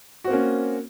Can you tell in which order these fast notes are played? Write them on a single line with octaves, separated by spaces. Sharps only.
F#4 C4 A#3 C#4